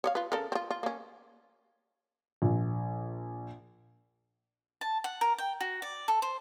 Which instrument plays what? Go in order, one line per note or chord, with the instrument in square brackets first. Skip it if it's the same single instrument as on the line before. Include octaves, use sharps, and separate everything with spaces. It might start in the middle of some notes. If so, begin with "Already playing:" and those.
[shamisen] C#5 D5 F5
F4 B4
C#3 A4 A#4
C4 F4
F4
A#3 C#4
[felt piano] A#1
[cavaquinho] A5
F#5
A#4
G5
F#4
D5
A4
C5